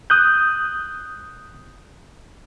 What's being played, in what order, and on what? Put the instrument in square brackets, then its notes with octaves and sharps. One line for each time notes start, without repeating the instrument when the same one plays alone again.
[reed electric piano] D#6 F#6 G6